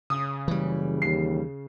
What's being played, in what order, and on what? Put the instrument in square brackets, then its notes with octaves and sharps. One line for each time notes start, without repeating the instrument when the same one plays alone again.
[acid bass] C#3 [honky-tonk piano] D#6
[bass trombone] F#1 [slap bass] E3 G3
[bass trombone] D#2 [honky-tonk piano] C7